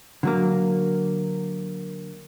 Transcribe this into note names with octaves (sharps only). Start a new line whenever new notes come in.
D3 F#3 A#3